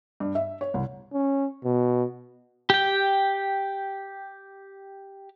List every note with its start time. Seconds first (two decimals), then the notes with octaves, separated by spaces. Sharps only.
0.20 G2
0.35 E5
0.61 C#5
0.74 C2
1.13 C#4
1.64 B2
2.70 G4 G5